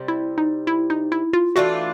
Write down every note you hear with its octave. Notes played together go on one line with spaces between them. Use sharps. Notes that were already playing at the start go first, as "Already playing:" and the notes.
Already playing: C3 G3
E4
D#4
E4
D#4
E4
F4
E3 A3 D4 F4 F#4